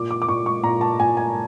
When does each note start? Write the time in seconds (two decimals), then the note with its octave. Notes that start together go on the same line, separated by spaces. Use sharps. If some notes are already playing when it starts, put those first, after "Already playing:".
Already playing: A#2 D6
0.11 D6
0.22 D6
0.28 A#2 C#6
0.46 C#6
0.63 A#2 A#5
0.81 A5
1.00 A#2 G#5
1.17 G#5